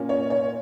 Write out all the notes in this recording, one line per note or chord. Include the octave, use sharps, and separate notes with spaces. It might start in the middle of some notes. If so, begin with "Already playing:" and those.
Already playing: A#2 A#3 C#4
C#5
C#5